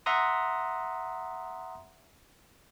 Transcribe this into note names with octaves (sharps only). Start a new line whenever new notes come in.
E5 F#5 A#5 C6 D#6